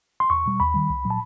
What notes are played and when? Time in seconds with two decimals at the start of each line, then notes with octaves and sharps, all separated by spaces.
0.20 C6
0.30 E2 C#6
0.46 B2 G3
0.60 D#2 B5
0.74 D#3 G3
0.90 C2
1.05 A#2 F#3
1.10 A5